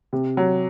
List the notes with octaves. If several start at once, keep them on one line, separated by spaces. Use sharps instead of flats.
C3
F#3